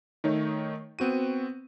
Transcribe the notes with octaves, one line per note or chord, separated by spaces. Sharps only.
D#3 A3 D#4 C#5
B3 C4 F#4 D#7